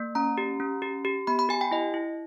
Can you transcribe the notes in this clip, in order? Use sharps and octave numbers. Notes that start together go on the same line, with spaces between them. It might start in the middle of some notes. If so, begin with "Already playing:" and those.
Already playing: A#3
C#4 A#5
G4
C#4
G4
G4
B3 B5
B5
G4 G#5
G5
E4 D#5
E4